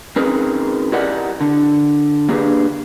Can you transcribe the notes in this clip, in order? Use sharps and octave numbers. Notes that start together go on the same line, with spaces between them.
C4 C#4 D#4 G#4 A#4 B4
E4 G4 A#4 D5 D#5 F#5
D3
A#3 D4 G4 G#4 B4